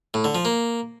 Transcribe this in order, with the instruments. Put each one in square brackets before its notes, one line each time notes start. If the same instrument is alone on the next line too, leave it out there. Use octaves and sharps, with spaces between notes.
[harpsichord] A2
D3
F3
A#3